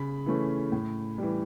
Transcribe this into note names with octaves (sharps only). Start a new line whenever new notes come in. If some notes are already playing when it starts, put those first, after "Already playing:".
Already playing: C#3 B5
E3 A3 C#4
A2
E3 G3